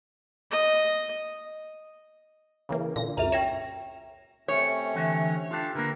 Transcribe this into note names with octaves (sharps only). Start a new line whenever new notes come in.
D#5
C#3 E3 A#3
A#2 D3 A#6
C#2 F#2 E5 A#5 F6
C#5 G5 A#6 E7
C3 A3 C#4 C#5
D3 E3 E5
D4 F4 G4 A4
D3 A#3 A#4 B4